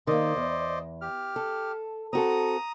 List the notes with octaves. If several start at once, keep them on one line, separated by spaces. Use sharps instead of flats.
D#3 A#3 C5 D5 D#5
E2
G4 F6
A4
C4 F#4 A4 A#5 D#6